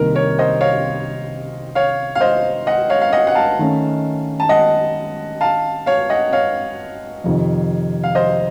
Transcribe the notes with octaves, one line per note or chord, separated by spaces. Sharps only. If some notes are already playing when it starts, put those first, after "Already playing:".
Already playing: C2 C3 D#3 A#3 A#4
A#4 C#5
C5 D#5
C#5 F5
C#5 F5
F5
C5 D#5
D#5 F#5
C#5 F5
F5
D#5 F#5
F#5
F5 A5
D#3 A3 C#4
A5
D#5 F#5
F5 A5
C#5 F5
D#5 F#5
C#5 F5
F2 C3 D#3
F5
C5 D#5